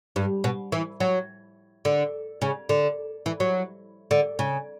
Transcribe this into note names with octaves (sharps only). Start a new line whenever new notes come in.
G2
B2
E3
F#3
D3
C#3
D3
E3
F#3
D3
C#3